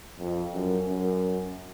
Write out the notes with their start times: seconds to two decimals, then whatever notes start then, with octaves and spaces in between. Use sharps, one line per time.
0.19 F2
0.54 F#2
0.89 F#2